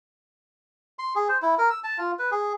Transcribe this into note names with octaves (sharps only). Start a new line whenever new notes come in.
C6
G#4
C5
E4
A#4
E6
A5
F4
B4
G#4